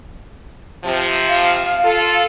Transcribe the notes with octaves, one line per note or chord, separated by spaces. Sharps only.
C3 F3
F5
F4 A4